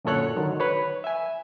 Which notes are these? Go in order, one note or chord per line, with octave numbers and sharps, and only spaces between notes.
F#2 A#2 D3 A4 C#5 F#6
D3 D#3 F#3
B4 C#5
E5 G#5